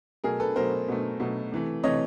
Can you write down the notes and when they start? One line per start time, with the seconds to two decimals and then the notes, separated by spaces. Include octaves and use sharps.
0.24 B2 F#3 A3 G#4 A#4
0.40 A4 B4
0.56 B2 F#3 A3 A#4 C5
0.88 B2 F#3 A3
1.20 B2 F#3 A3
1.52 C3 E3 A3
1.84 C3 E3 A3 C#5 D#5